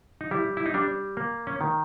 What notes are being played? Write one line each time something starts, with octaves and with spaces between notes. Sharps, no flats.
D#4
G3 E4
E4
D#4
G3 D4
A#3
C#4
D#3